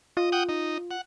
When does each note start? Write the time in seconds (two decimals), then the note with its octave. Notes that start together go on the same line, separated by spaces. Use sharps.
0.17 F4 D#5
0.32 F#5 G5 D#6
0.49 D#4
0.91 F#5